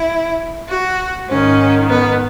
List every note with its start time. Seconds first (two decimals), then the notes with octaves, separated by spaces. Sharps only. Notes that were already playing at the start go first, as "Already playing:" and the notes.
Already playing: E4
0.68 F#4
1.28 G#2 D#3 C#4
1.89 B3